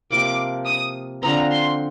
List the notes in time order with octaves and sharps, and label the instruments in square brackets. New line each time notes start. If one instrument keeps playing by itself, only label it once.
[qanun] C3 F3 A#3 [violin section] D6
[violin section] D#6
[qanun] D3 F3 C4 [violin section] A#5
[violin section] C6